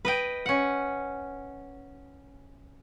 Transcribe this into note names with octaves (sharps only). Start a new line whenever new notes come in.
B4 D#5 G5
C#4 F#5